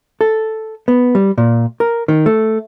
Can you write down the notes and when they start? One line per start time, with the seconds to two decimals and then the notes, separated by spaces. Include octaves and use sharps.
0.21 A4
0.88 B3
1.15 G3
1.38 A#2
1.80 A#4
2.08 D#3
2.26 A3